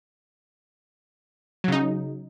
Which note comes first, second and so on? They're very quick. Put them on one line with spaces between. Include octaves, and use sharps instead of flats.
F#3 C#3 D#4